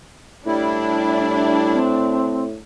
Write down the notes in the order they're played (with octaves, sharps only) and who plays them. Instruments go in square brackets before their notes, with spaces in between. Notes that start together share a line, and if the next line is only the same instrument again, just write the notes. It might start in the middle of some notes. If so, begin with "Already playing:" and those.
[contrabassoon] A2 [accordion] G3 E4 [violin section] D4
[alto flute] C4